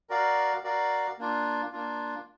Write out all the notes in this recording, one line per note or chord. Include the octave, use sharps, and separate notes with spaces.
F#4 A#4 D5 F5
F#4 A#4 D5 F5
A#3 D4 F4
A#3 D4 F4